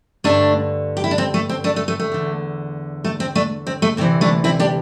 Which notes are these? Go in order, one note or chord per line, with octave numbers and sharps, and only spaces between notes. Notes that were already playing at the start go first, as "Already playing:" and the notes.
G2 D3 A3 D4
G4
E4
D4
C4
A3
C4
A3 D4
A3
A3
A3
E2 D3
A3
C4
A3 D4
C4
A3
D2 C3 E3 C4
A3 D4
C4 E4
D4 G4